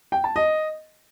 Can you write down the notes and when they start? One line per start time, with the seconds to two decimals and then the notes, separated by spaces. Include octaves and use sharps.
0.12 G5
0.24 A5
0.36 D#5